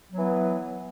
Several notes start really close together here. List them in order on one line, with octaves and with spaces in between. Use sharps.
F#3 B3 E3